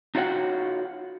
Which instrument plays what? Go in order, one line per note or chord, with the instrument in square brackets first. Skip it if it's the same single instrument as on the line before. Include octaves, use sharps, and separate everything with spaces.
[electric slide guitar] D#4 F4 F#4 C#5 F#5 G5